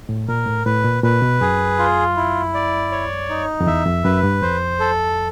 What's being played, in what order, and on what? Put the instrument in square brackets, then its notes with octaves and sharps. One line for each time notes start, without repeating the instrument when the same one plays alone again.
[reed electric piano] A2
[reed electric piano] A#2 [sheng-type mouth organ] A#4
[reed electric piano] A2
[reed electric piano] A2 [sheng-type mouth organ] B4
[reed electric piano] A#2
[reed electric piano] A#2 [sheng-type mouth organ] B4
[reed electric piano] B2
[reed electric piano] F#2 [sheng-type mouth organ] G#4
[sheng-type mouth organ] F4
E4
D5
C#5
D#4
[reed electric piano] F2
[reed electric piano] E2 [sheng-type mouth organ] E5
[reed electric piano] F2
[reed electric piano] F#2 [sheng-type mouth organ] B4
[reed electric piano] G2
[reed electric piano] F2 [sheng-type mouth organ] C5
[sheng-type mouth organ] A4